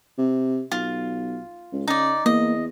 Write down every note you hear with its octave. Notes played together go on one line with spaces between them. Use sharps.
C3
B1 F4
C#2
C#3 D#4 D5
E2 A#3 D#5